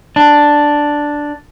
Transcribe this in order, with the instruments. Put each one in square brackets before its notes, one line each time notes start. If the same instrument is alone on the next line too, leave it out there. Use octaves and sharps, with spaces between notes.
[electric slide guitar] D4